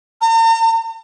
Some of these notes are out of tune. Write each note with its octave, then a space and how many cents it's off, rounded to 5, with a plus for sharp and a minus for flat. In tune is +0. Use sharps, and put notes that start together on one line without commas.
A#5 -45